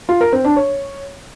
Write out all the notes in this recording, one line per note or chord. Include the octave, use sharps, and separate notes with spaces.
F4
A#4
C4
D4
C#5